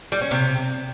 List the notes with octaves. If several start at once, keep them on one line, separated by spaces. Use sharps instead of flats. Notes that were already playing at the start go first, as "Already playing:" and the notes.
G3
C#4
C3